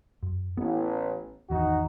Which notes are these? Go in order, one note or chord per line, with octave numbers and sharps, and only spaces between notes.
F#2
A1 B3 C#4
G#1 E2 D#3 D#4 F#4